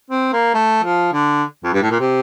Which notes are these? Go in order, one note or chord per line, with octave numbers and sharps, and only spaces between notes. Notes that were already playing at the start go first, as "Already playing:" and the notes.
C4
A#3
A3
F3
D3
F2
G2
A2
A#2
C3